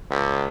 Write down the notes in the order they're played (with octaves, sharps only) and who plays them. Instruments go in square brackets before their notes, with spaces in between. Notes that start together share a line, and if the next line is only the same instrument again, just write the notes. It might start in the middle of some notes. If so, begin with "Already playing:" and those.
[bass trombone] C#2